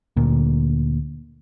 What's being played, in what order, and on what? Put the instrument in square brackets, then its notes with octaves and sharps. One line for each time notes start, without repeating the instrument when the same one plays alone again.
[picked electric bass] D2 A#2